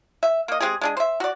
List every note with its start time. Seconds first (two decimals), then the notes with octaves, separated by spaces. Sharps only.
0.23 E5
0.48 A#3 D#5
0.60 G#3 C4 G4 G#4
0.81 G#3 D4 G#4
0.97 C5 E5
1.20 F#4 D5